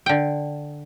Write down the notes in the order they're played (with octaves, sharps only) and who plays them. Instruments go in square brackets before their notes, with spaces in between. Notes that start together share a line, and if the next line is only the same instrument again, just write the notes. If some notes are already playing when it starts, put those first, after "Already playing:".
[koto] D3 G5